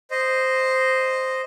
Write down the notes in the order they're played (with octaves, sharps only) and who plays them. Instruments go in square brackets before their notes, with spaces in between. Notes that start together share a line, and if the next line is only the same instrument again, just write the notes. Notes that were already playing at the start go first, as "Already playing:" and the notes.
[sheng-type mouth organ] C5 D#5